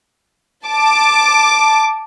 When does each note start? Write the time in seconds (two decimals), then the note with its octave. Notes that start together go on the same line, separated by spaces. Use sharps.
0.66 A5 D6